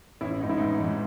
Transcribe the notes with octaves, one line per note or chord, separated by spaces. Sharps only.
A1 C#4 E4
G#2 E3 D#4
E4
A1 B3 D#4
G#2 E3